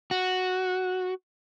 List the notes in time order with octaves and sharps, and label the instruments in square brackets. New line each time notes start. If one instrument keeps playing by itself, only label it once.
[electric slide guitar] F#4